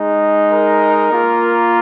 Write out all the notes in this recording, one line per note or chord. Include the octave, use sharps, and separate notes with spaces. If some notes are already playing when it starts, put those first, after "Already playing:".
Already playing: G#3 D#4
A#4
A#3 F4